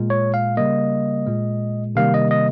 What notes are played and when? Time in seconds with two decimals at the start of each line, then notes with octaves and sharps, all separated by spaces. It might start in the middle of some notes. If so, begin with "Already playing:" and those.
Already playing: A#2 G#3
0.10 C#5
0.34 F5
0.57 C#3 G3 A#3 D#5
1.27 A#2 G#3
1.95 C3 D#3 G3 A#3 F5
2.14 D#5
2.31 D#5